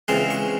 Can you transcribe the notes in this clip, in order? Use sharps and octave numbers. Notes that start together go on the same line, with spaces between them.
C#3 E3 G#3 C4 F4 C6
C#6